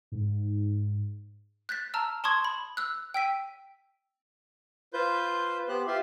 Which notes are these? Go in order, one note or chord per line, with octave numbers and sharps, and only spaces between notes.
G#2
F#6 G6 A6 B6
A5 A#5 E6 F6
A5 C6 C#6 D#6 G#6
B5
E6 F#6
G5 E6 B6 D#7
F4 B4 C5 G6
B3 G4 C5 F#6
F4 G4 E5 C6